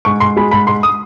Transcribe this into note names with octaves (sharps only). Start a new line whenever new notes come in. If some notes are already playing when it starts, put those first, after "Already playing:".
G#2 C#6
G#2 C6
G#3 B5
G#2 B5
G#2 C6
D#6